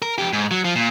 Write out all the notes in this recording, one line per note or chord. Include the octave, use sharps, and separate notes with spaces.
A#4
F2 G4
G#2
F#3
F3
A#2